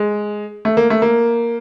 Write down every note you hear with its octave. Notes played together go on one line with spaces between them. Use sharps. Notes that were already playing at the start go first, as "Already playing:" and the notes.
Already playing: G#3
A3
A#3
A3
A#3